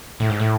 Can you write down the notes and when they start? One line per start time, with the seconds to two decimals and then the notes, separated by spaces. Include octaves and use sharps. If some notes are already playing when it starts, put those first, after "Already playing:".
0.20 A2
0.30 G#2
0.40 A2